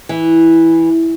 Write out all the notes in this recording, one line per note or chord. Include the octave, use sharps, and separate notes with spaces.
E3